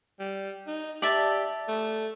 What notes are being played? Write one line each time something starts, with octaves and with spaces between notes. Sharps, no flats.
G3
D#4
G4 D5 E5 A5
A3